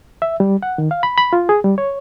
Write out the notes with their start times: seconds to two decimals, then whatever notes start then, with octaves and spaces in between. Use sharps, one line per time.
0.22 E5
0.40 G3
0.63 F#5
0.78 D#3
0.91 F5
1.03 B5
1.18 B5
1.33 F4
1.49 G#4
1.64 G3
1.78 C#5